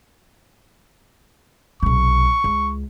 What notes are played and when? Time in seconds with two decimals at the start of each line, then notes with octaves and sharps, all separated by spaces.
1.83 B1 C3 C#6
2.44 C#2